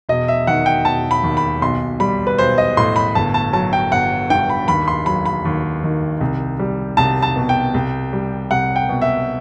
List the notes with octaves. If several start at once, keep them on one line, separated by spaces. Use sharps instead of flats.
E1 D#5
E5
D#3 F#5
G5
E1 A5
B5
D#2
B5
B1 C6
G3 B5
B4
B1 C5
D#5
A2 C6
B5
G1 A5
A5
F#3 A5
G5
G1 F#5
G2 G5
B5
D#2 B5
C6
F#3 B5
B5
D#2
D#3
C2
G3
C2 A5
A5
B2
G5
C2
G3
C2 F#5
G5
B2
E5